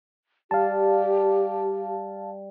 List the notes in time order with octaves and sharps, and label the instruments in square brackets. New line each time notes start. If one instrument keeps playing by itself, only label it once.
[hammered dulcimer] G3 [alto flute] G4 [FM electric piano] F5 A5